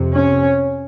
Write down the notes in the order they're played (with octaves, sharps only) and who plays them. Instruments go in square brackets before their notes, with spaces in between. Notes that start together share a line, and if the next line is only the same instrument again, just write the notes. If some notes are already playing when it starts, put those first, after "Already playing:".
Already playing: [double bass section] F2 C3
C#4